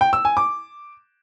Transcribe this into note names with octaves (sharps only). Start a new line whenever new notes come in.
G5
E6
G#5
D6